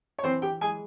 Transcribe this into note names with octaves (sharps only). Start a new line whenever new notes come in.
C#5
E3 C4 C5
G4 G5
G#3 G#4 G#5